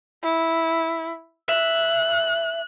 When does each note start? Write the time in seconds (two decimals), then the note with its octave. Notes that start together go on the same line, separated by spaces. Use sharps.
0.24 E4
1.49 E5 F#6